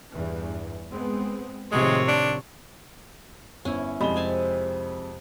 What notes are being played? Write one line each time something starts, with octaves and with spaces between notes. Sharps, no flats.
E2 G2 E3
G#3 B3 C4
A2 C3 D#3 F3 G#3 C#5
D4
G1 C#4 E4
F2 G3 G#3 D#5 B5 G7
C3 G#5 A5